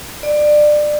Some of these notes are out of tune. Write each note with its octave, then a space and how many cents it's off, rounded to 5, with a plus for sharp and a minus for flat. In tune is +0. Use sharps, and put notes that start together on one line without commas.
D5 +20